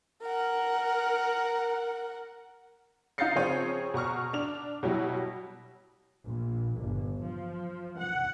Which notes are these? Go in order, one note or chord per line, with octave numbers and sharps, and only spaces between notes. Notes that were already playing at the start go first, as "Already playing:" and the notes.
A#4 F#5
D#4 F5 G6 A6 C7 C#7
C#3 F3 C4 G#4 C#5 D#7
B2 A#5 C#6 F6
D4 F7
B2 F#3 G3 E4
A#1
G1
F3
F#5